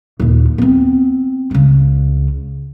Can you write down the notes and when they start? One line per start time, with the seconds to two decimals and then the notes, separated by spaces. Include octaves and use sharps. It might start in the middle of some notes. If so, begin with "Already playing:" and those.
0.20 D#2 A#2
0.58 B3 C4
1.51 C#2 C#3